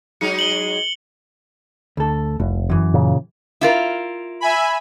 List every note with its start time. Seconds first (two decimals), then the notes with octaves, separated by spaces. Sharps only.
0.21 F#3 G#3 D#4 C#7
0.39 F#7 G7
1.97 D2 A4
2.40 F1 C2
2.70 F#2 E3
2.94 A#2 C#3
3.61 E4 F4 A#4
4.40 E5 G#5 B5